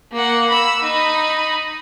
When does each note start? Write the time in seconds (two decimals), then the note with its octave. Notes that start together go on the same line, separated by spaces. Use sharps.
0.12 A#3 F#5
0.49 B5 E6
0.83 D#4 B5